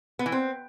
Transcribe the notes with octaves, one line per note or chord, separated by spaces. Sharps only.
B3
E3
C4